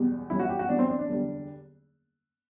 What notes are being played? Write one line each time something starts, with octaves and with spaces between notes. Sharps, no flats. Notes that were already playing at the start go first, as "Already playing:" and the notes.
Already playing: F#1 E2 B2 G3
G1 F#2 E3 G3 E4
F#4
G4
F#4
G1 F#2 E3 G3 D4
C4
D4
D4
F#1 E2 D3 G3